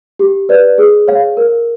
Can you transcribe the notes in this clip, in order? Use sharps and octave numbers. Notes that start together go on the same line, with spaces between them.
G4
B4 D5
G#4
C#5 F5
A#4